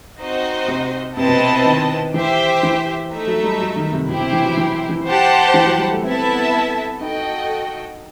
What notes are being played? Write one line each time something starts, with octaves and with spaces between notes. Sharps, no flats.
C4 D#4 F#4 C5 D#5
C3
C3 C4 E4 B4 D#5 A5
B2
C3
D#3
E3 G4 C5 E5
E3
A3 D#4 A4 E5
F#3
G3
F#3
D#3
C3
B2 E4 G4 C5
C3
E3
F#3
E3
E3
G4 C5 F#5 A5
E3
F#3
G3
A3
B3 C4 E4 A4 E5 A5
D#4 F#4 A4 D#5 G5